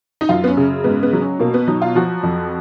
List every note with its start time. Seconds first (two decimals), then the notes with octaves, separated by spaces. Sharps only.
0.21 D#4
0.29 F#2 F4
0.44 B3
0.47 C#4
0.57 C#3
0.84 G#2 B3
1.03 B3
1.13 F#3
1.21 C#4
1.40 B2 A#3
1.54 B3
1.68 F#3 D#4
1.82 F4
1.95 F3 F#4
2.23 F2